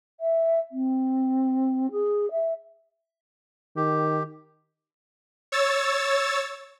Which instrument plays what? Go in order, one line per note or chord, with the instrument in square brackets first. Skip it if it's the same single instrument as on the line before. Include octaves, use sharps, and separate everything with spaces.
[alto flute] E5
C4
G#4
E5
[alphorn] D#3 [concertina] G4
[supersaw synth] C#5 E6 A6